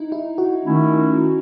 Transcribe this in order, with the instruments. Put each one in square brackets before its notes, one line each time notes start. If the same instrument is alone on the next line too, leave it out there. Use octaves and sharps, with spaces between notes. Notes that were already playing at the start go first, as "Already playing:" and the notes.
Already playing: [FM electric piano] D#4 E4
E4
F#4
[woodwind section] D#3 A3 C#4 E4